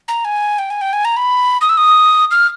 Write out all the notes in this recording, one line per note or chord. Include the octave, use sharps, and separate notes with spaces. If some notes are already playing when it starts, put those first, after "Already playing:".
A#5
G#5
G5
G#5
G5
G#5
A#5
B5
D#6
E6
D#6
F6